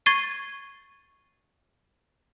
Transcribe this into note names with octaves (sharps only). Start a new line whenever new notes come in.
C#6 G#6 A6 C7 D#7